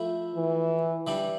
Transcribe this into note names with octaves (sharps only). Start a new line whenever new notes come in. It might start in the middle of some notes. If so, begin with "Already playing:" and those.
Already playing: F3 A3 E4
E3
E3 G3 D4